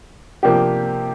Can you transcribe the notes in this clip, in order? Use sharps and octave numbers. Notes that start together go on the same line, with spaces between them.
C3 F3 A#3 D4 G4